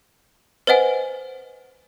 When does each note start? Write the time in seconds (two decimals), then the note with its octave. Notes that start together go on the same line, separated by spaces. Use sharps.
0.67 B4 C5 D#5 F#5 G#5